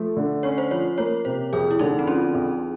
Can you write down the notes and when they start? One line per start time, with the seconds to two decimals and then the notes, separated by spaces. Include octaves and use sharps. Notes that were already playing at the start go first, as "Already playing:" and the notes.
Already playing: F3 A3
0.16 D3
0.43 C#4 C#5
0.58 C5
0.71 F3 C#5
0.98 A#3 C#5
1.25 C3 C5
1.53 F2 G#4
1.71 E4
1.79 D3 D#4
1.99 C4
2.07 F3 C#4
2.34 F2